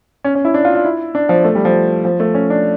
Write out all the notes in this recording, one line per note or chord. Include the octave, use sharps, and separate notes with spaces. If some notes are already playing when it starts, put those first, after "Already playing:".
C#4
C#4
E4
D4
F4
F4
E4
D4
F3
A3
G3
F3
F3
A3
C#4
D4